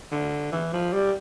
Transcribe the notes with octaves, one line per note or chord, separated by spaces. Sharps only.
D3
E3
F3
G3